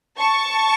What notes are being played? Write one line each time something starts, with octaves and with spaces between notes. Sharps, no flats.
A5 C#6